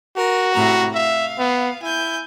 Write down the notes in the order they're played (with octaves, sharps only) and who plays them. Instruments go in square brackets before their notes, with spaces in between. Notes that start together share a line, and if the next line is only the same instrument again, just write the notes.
[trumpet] F#4 [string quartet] A#4
[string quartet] A2 C3 A#5
[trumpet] E5 [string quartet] F5
[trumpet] B3
[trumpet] E4 [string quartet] G#5 G6